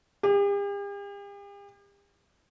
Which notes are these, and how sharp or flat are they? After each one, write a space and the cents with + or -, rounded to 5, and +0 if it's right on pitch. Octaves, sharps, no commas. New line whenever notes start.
G4 +45